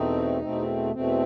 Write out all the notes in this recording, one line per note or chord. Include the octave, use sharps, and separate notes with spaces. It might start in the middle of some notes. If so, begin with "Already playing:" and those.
Already playing: E2 B2 A3 C4 D#4
E2 B2 A3 C4
E2 B2 A3 C4